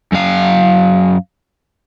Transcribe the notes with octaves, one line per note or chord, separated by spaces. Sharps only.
F#2 F5